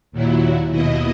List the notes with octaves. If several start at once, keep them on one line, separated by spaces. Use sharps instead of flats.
D#2 A#2 F#3 E4
D#2 B2 E4 D#5